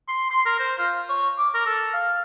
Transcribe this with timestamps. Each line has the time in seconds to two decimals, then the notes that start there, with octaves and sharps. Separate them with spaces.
0.08 C6
0.31 C6
0.46 A#4
0.59 C5
0.78 F4
1.09 C#5
1.38 D6
1.55 A#4
1.66 A4
1.94 F5